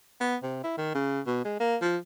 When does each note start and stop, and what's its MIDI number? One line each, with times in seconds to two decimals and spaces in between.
0.21 0.36 59
0.43 0.60 48
0.64 0.75 64
0.78 0.92 51
0.95 1.21 49
1.27 1.41 47
1.45 1.56 56
1.60 1.76 58
1.82 1.97 53